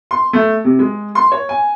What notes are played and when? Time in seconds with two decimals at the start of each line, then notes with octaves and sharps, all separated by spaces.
0.11 C6
0.33 A3
0.64 C3
0.79 G#3
1.15 C6
1.32 C#5
1.49 G#5